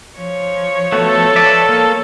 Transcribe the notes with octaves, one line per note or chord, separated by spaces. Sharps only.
F3 C#5
A3 B3 F#4 A4
B4 D5 E5
A#3